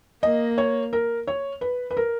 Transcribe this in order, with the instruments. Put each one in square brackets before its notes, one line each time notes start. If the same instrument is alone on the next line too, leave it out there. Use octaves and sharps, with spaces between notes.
[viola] A#3 [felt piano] D#5
[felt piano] C#5
A#4
C#5
B4
B4
A#4